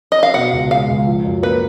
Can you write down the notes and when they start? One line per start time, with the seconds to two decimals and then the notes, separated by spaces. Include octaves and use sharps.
0.12 D#5
0.23 F5
0.34 B2 F#5
0.52 C#2
0.70 G#3 F5
0.88 C#2
1.07 F3
1.25 F#2
1.43 A#3 B4